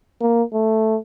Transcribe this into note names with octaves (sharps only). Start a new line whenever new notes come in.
A#3
A3